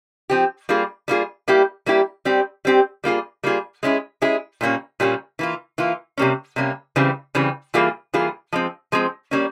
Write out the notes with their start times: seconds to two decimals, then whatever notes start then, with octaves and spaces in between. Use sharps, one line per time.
0.30 F3 C4 G4
0.69 G3 A#3 F4 G#4
1.08 G3 A#3 F4 G#4
1.48 G3 A#3 E4 G4
1.86 G3 A#3 E4 G4
2.25 G3 C4 G4
2.65 G3 C4 G4
3.04 G3 A#3 F4 G#4
3.43 G3 A#3 F4 G#4
3.83 G#3 C#4 E4 G#4
4.22 G#3 C#4 E4 G#4
4.61 A#2 G3 A#3 C#4
5.00 A#2 G3 A#3 C#4
5.39 E3 A#3 F4
5.78 E3 A#3 F4
6.18 C3 G3 A#3 C#4
6.56 C3 G3 A#3 C#4
6.96 C#3 E3 G3 C4
7.35 C#3 E3 G3 C4
7.74 E3 G3 A#3 F4 G#4
8.14 E3 G3 A#3 F4 G#4
8.53 F3 G#3 C4
8.92 F3 G#3 C4
9.31 G3 A#3 C#4